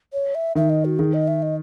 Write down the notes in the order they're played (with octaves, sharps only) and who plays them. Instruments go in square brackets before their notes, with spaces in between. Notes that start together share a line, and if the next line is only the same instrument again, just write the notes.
[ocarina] C#5
E5
[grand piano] D#3 [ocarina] E5
[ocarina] D#5
F#4
[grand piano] D#3 [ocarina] G#4
[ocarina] D#5
E5
D#5